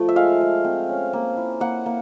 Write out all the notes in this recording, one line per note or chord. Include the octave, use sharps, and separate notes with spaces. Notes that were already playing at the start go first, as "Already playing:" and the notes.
Already playing: F3 A3
E5
G#3 F5
G#3
C4
C#4
A#3
E4
A#3 F#5
A#3